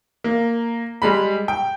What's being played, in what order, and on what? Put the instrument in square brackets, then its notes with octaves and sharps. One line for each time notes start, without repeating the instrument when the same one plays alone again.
[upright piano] A#3
G3 G#3 B5
G5